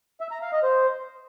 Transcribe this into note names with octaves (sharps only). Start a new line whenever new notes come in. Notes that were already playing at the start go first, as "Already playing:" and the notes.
E5
A#5
F5
D#5
C5